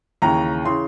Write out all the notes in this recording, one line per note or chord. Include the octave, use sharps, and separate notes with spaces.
D#2 C#3 E3 A#5
C#3 E3 C6